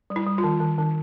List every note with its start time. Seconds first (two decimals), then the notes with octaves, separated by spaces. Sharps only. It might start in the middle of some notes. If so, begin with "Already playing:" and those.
0.10 G3
0.16 E4
0.26 G3
0.38 F4
0.44 D#3
0.60 D#3
0.78 D#3